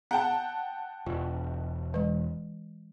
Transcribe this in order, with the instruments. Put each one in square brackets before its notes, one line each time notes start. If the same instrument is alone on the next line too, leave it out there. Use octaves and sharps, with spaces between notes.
[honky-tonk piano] F#5 G5 A5 [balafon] A#5
[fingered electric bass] E1 [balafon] F4
[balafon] E3 G#3